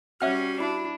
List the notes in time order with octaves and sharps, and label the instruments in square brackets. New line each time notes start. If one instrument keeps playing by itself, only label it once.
[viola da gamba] G3 C#4 [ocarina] F#4 [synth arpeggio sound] E5 F#5 F6
[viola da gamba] D4 [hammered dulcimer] E4